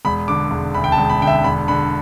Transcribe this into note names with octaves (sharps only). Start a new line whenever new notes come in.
E1 B5
D3 D6
E1
D2 B5
G5
A5
E1
B5
D3 G5
E5
E1 B5
D3 B5